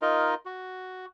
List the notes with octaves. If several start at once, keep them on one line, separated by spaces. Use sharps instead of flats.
D#4 F4 A#4 D#5
F#4